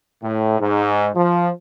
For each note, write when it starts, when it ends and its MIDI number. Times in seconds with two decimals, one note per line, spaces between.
0.22 0.57 45
0.59 1.10 44
1.15 1.49 53